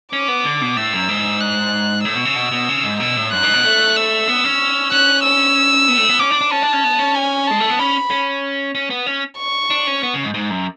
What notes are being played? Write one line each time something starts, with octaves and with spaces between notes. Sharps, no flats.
C#4 D6
B3
D3
B2
A2 E6
F#2
G#2
F#6
A2 E6
B2
C#3
B2
B2
C#3
G#2
B2 E6
A2
F#2 F#6
G#2
B2
A3
E6
B3
C#4
C#4 F#6
E6
B3
A3
B3
C#4 D6
D4
D4
C#4 A5
D4
C#4
B3
C#4
G#5
G#3 A5
A3
B3
C#4 B5
C#4
C#4
B3
C#4
C#6
D4
C#4
B3
C#3
G#2
G#2
F#2